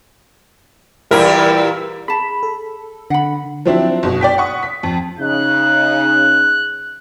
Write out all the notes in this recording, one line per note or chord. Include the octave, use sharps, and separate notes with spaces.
E2 A#2 G3 E4 A#4
G#4 A5 B5
A4
D3 F#5 B5
F3 F#3 C4 D4 E4
F#1 B2
D5 G5 B6
F#5 C#6 D#6
B6
F2
C#3 D#4 F#6